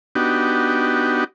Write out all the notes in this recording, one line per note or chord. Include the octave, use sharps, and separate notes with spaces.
B3 D4 D#4 F#4 G4